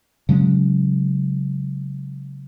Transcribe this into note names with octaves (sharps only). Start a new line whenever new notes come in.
C#3 F#3 G#3 C#4